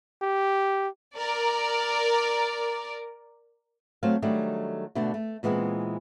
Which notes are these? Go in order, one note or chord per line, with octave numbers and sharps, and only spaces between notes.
G4
A#4 D5
F#3 A3 C4 C5 F5
D#3 F#3 G3 A3 D4
B2 D3 A3 D4
A3
A#2 E3 G#3 B3 C4